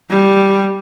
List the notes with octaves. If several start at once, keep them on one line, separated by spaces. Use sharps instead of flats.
G3